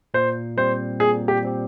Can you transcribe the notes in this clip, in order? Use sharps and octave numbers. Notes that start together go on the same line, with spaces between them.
A#2 C5
G3 C4 G4 C5
A#2 G#4
G4
G3 C4 G4